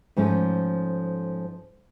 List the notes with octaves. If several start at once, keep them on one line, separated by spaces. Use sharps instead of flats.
G#2 F3 A3 C#4